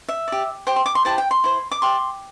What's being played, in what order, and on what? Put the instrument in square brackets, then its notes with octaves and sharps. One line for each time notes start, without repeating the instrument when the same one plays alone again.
[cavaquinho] E5
G4 D5
G4 C5 G5
C6
D6
C6
E4 G4 C5 A5
G5
C6
E4 C5
D6
G4 D5 C6